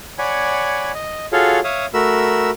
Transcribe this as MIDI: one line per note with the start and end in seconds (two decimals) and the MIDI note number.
0.19 0.92 73
0.19 0.92 74
0.19 0.92 78
0.19 0.92 80
0.19 0.92 83
0.94 1.26 75
1.32 1.60 65
1.32 1.60 66
1.32 1.60 68
1.32 1.60 69
1.32 1.60 73
1.32 1.60 77
1.64 1.86 73
1.64 1.86 76
1.64 1.86 77
1.64 1.86 87
1.94 2.50 57
1.94 2.50 66
1.94 2.50 70
1.94 2.50 83
1.94 2.50 88